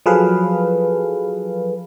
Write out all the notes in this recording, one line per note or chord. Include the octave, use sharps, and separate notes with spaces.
F3 F#3 G#4 A4 B4 F5